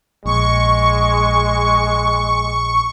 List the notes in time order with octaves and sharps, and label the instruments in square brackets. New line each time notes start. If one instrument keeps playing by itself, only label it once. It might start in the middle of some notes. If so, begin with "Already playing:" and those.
[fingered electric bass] A#1 [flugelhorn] G#3 [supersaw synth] C#6